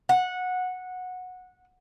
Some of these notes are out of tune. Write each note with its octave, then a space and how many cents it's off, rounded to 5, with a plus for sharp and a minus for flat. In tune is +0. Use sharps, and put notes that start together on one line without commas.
F#5 -15